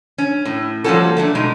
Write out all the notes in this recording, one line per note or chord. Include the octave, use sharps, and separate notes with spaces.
C#4
A2
F3 G3 A#3 C#4 F#4 A4
F#3 A3 D4
B2 G#3 D#4